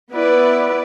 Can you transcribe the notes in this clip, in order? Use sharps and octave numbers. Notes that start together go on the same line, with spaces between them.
B3 E4 B4 D5